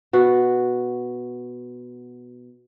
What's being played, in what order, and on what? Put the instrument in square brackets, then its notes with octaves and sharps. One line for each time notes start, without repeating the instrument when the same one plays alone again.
[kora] B2 F#4